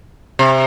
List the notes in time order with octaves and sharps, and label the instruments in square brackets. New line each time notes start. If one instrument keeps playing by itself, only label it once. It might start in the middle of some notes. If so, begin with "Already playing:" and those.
[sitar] C3